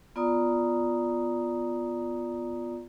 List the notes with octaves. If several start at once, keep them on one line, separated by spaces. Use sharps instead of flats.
B3 F4 D5 A#5 D#6